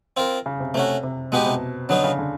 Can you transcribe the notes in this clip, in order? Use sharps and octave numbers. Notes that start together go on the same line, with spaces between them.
C4 F4 A#4
C#3
C3
C3 A3 C#4 F#4
C3
B2 G#3 B3 D#4 G4
C3
D3 F#3 B3 D#4
C#3
D3